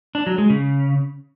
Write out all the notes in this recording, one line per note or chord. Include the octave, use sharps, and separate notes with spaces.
D4
F#3
G#3
C#3